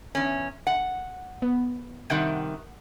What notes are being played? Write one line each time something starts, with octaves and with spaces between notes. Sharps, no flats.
E2 C#4
F#5
B3
C3 D#3 G3 F#5 G6 D7